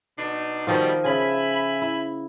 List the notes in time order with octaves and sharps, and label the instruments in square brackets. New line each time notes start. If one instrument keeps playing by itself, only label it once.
[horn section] B2 D4 D#4
[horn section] B2 G3 [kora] D#3 F3 F4
[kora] C#3 [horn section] E5 G#5 B5
[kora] E4